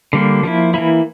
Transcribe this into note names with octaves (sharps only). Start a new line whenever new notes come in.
D3 G3 A#3
F3 A#3 E4
E3 A#3 E4